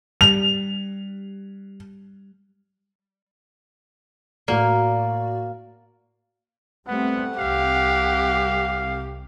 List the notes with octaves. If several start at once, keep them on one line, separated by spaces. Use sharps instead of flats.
G3 F7
A2 A#3 F#4 D5
G3 A3 B3 C4 F#5
C2 G4 F5